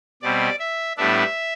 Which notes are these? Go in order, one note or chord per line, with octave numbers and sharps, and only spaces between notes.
B2 G3 C4 D5
E5
A2 G3 B3 D4 E5